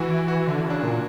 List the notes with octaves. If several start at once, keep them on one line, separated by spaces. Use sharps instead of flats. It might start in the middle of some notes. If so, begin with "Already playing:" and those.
Already playing: E3 E4 F#4
E4
F#4
E3
D3
C#3
D4
A#2